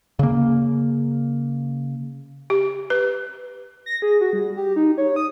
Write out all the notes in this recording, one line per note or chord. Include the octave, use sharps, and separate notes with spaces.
C#3 A#3
G4
B4
A#6
G#4
F#4
G3
G4
D#4
C#5
D#6